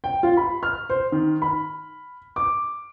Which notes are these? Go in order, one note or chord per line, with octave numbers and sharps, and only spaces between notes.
G5
F4
B5
F6
C5
D#3
B5
D6